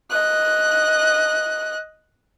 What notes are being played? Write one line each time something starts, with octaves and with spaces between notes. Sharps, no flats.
D#5 F#6